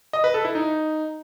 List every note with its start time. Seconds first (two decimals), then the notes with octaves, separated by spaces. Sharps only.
0.13 D#5
0.24 B4
0.34 A4
0.45 E4
0.55 D#4